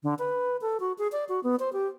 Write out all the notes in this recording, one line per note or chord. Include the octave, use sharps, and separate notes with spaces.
D3
B4
A4
F#4
G#4
D5
F#4
B3
C5
G4